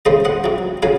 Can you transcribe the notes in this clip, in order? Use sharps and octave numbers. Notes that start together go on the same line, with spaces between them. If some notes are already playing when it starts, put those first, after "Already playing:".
C#3 G#3 C5 D#5
D#5 F#5
C3 F#3
C#3 F#3 F5 G#5